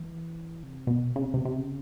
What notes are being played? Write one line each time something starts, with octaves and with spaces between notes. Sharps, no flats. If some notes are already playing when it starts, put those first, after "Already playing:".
Already playing: E3
C3
B2
C#3
C3
C3
C3
C#3